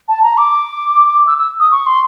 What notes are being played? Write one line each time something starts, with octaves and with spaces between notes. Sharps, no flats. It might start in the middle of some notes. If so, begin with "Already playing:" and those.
A5
A#5
D6
E6
E6
D#6
C#6
C6